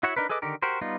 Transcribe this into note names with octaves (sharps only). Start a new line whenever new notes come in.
E4 F#4 C#5 E5 F#5
D4 D#4 A#4 B4
G#4 A4 B4 D#5 D6
D3 D#3 G4 A#4
F#4 G4 A#4 C5
G3 B3 D#4 F4